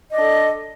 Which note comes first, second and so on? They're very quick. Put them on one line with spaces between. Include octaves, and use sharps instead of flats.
D#5 D5 D4 A4